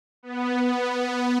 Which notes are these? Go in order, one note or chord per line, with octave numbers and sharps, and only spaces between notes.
B3